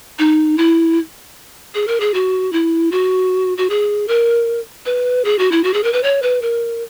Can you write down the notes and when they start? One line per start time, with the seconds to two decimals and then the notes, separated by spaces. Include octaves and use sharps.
0.19 D#4
0.58 E4
1.74 G#4
1.87 A#4
2.00 G#4
2.14 F#4
2.52 E4
2.92 F#4
3.58 F#4
3.70 G#4
4.08 A#4
4.86 B4
5.25 G#4
5.39 F#4
5.52 E4
5.64 F#4
5.74 G#4
5.83 A#4
5.93 B4
6.03 C#5
6.22 B4
6.42 A#4